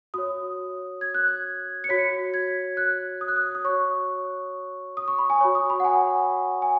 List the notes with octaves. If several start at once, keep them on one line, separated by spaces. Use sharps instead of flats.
F#4 C#5 D#6
G#6
F#6
G#6
C#7
F#4 C#5 B6
G#6
F#6
D#6
F#6
D#6
D#6
F#4 C#5 C#6
D#6
C#6
B5
G#5
F#4 C#5 C#6
D#6
B5
F#5
G#5
G#5